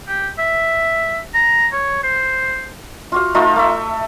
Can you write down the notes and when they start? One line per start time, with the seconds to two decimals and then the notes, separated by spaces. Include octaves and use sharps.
0.08 G4
0.39 E5
1.34 A#5
1.73 C#5
2.03 C5
3.12 F4 F#4 F5
3.35 A3 D#4 F4
3.56 A3 E5